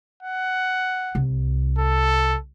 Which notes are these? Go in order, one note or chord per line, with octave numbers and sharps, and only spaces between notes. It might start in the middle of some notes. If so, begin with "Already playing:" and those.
F#5
C2
A4